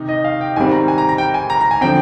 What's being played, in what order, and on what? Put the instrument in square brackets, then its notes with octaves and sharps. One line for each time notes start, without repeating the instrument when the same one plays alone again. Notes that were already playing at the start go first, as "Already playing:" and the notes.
Already playing: [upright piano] C3 D#3 D#4
[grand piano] D#5
F5
G5
[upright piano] G#2 D#3 G3 C4 [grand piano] G#5
[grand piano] A#5
G#5
A#5
A#5
G5
G#5
A#5
A#5
G#5
[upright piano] D3 F3 C4 [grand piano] G5